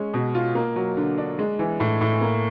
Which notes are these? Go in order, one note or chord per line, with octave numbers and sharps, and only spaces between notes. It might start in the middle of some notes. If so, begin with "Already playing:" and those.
Already playing: G#3 C#4
B2
F4
A#3
F#3
D3
D4
G#3
E3
A2
A2
A#3